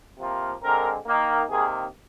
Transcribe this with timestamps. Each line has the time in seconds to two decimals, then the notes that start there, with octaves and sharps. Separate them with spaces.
0.17 C3 F3 A#3
0.61 D3 G#3 C4 A#4
1.07 D#3 A#3
1.51 C3 D#3 A#3 G#4